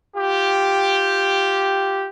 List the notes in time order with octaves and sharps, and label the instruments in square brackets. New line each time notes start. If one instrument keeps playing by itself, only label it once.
[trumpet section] F4 G4